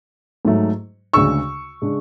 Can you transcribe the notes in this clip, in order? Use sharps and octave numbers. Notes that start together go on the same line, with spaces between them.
G#2 F#3 A3
D2 C#3 G#3 D4 C#6 E6
C#3 G#3 D4